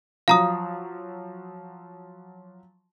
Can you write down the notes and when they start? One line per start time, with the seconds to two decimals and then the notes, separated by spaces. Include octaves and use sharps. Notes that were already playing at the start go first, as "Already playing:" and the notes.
0.28 F3 F#3 F5 A#5 D#6